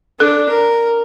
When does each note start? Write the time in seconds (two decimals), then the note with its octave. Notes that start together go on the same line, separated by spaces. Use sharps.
0.20 D4 A4
0.49 A#4